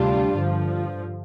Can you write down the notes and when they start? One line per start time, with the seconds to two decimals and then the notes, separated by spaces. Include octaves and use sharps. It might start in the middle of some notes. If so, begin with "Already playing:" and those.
Already playing: D2 C3 G3 D4 F4
0.37 G2 D3 F3